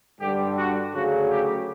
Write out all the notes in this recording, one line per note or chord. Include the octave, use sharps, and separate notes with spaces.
G2 D3 G3 G4
F#4
D2 C#3 F#3 F#4
G4